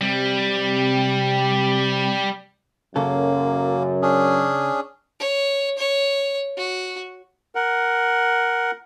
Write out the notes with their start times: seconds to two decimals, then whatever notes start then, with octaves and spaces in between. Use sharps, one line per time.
0.01 C3 G3
2.96 F#2 C#3 A#3 A4
4.02 C#4 D4 G#4
5.20 C#5
5.78 C#5
6.57 F#4
7.55 A#4 F#5